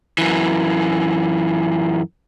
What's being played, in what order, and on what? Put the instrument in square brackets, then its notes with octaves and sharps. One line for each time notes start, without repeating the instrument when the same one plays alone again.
[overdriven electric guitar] F#2 E3